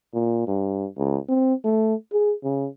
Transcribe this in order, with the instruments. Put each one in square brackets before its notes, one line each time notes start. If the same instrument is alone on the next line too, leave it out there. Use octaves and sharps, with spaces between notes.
[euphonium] A#2
G2
C#2
C4
A3
G#4
C#3